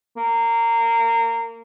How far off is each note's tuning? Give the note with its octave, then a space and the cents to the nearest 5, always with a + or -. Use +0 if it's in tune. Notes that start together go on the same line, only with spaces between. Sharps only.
A#3 -20